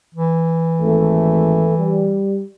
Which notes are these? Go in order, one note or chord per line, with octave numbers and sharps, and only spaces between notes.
E3
G#1 A3
G3